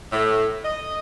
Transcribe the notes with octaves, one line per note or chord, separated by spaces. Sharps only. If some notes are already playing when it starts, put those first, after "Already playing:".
A2
D#5